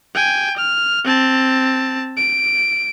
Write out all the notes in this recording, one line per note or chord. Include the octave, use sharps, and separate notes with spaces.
G5 G#5
F6
C4 A5
D7